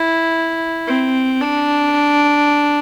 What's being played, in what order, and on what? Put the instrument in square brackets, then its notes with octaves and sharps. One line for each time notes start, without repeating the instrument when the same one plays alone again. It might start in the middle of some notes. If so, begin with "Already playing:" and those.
Already playing: [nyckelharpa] E4
C4
D4